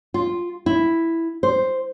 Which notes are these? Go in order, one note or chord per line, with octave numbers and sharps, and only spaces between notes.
F4
E4
C5